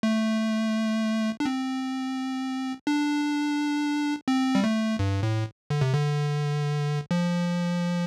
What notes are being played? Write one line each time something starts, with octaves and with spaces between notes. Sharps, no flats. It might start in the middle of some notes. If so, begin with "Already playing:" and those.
A3
D4
C4
D4
C4
G3
A3
G2
A2
D3
C3
D3
F3